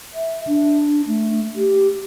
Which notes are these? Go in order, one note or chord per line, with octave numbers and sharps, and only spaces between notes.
E5
D4
A3
G4